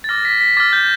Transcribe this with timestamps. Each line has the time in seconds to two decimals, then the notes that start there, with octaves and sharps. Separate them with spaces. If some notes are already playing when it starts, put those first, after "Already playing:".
0.04 A6
0.09 D6 F6 A#6
0.25 B6
0.41 B6
0.57 D6 F6 A6
0.73 G6